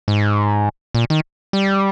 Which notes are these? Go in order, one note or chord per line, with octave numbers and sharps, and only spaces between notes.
G#2
A#2
D#3
G3